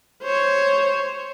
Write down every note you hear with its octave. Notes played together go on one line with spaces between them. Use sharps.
C5 C#5